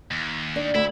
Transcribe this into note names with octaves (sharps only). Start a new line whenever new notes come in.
D#2
D4
D2 E4